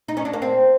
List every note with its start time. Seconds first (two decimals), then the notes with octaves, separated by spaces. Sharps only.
0.08 D#4
0.17 C#4
0.25 D4
0.33 A#3
0.42 C4